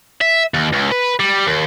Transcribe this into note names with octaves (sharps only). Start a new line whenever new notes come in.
E5
D#2
C#2
B4
G3
D#2